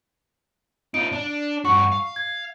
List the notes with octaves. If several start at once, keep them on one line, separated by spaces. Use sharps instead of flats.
D#4 F4 D7
D4
G2 F#4 C#6
F5
G#6